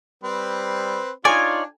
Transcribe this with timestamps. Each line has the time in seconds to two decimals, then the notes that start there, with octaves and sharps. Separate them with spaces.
0.24 G3 C4 B4 C5
1.25 D4 D#4 F4 C#5 D5 G#5